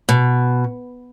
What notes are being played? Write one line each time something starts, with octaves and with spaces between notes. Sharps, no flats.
B2